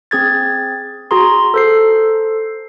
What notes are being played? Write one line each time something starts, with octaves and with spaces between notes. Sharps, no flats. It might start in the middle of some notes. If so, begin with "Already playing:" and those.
C4 G#4 G#6 A6
F#4 G#4 A#5 C6
A4 C5 C7